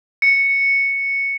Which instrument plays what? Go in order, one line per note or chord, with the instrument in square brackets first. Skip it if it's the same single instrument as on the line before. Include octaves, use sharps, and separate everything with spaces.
[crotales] C#7